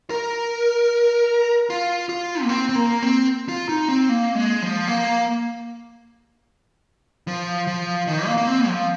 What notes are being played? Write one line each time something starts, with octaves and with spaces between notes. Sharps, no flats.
A#4
F4
F4
A#3
C4
C4
A#3
C4
F4
D#4
C4
A#3
G#3
F3
A#3
F3
F3
D#3
A#3
A#3
C4
F3